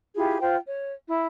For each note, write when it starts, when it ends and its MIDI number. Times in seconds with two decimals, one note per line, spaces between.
0.15 0.38 64
0.15 0.38 65
0.15 0.38 67
0.15 0.38 68
0.40 0.56 65
0.40 0.56 72
0.40 0.56 79
0.65 0.92 73
1.08 1.27 64